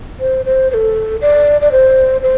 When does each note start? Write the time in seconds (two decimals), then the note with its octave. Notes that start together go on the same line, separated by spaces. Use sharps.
0.20 C5
0.45 C5
0.71 C5
0.74 A4
1.21 D5
1.61 D5
1.72 C5
2.23 C5